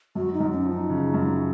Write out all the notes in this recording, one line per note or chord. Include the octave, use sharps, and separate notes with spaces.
F#2 F#4
D#4
F#2
C#4
F3 D#4
C#3
F#2